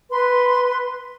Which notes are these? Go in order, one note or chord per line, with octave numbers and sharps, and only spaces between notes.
B4 C6